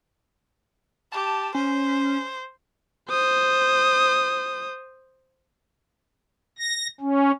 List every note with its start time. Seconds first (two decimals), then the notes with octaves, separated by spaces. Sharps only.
1.12 G4 A5
1.55 C#4 C5
3.09 C5 D#6
6.58 A#6
7.00 C#4